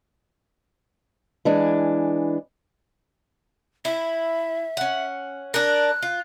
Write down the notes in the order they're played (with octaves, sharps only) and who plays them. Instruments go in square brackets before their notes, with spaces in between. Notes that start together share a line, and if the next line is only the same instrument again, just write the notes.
[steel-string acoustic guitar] E3 G#3 D4
[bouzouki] E4 [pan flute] E5
[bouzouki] C#4 F#5
[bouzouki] D4 A#4 [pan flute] F#6
[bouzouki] F4